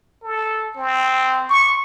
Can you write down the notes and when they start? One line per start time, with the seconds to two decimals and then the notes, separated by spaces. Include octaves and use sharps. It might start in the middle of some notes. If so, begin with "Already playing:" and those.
0.23 A4
0.76 C4
1.49 C#6